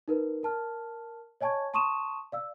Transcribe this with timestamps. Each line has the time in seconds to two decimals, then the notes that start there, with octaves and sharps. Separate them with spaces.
0.08 D#4 A#4 B4
0.43 A#4 A5 F6
1.41 C#5 D#5 G#5 A5 C#6 G#6
1.74 A5 C6 C#6 D#6 D#7 E7
2.32 D5 F5 E6